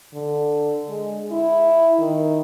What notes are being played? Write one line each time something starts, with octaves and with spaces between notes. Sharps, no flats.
D3
G#3
E4
D#3